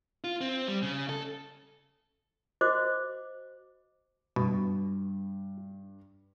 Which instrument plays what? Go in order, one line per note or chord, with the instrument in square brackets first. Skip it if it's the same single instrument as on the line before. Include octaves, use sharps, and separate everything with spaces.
[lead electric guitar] F4
C4
G3
C#3
A4
[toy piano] F#4 C5 D#5 D6
[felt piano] G2 [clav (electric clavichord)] B2